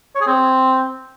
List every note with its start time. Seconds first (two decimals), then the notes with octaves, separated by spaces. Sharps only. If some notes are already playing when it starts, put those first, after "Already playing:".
0.15 C#5
0.21 G#4
0.27 C4